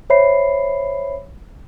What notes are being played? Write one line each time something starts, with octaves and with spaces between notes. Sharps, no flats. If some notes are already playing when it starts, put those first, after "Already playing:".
C5 C#5 E5 B5 C7